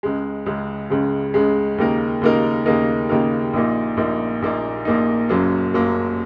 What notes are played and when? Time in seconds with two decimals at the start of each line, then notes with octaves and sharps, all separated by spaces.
0.03 C#2 C#3 G#3
0.46 C#2 C#3 G#3
0.90 C#2 C#3 G#3
1.34 C#2 C#3 G#3
1.78 D#2 C#3 A#3 D#4 A#4
2.22 D#2 C#3 A#3 D#4 A#4
2.66 D#2 C#3 A#3 D#4 A#4
3.09 D#2 C#3 A#3 D#4 A#4
3.53 A#1 A#2 A#3 D#4
3.97 A#1 A#2 A#3 D#4
4.42 A#1 A#2 A#3 D#4
4.85 A#1 A#2 A#3 D#4
5.29 F#1 F#2 F#3 A#3
5.74 F#1 F#2 F#3 A#3